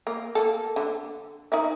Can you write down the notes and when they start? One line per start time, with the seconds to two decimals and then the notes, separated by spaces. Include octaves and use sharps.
0.07 A#3
0.35 A#3 A4
0.76 D3
1.52 D#4 A#4 E5